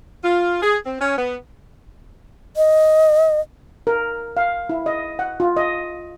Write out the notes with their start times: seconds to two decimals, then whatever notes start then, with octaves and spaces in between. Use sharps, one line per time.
0.24 F4
0.62 G#4
0.85 C4
1.00 C#4
1.17 B3
2.57 D#5
3.87 A#4
4.37 F5
4.70 E4
4.86 D#5
5.19 F#5
5.40 F4
5.57 D#5